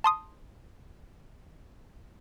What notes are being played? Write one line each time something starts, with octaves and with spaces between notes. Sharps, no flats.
A5 C6 D#6